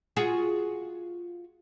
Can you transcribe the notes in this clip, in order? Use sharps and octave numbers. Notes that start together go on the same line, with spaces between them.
F4 F#4 G#4